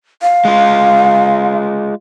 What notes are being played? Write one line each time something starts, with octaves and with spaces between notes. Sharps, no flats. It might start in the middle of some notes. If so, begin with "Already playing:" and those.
F5
G#3 F4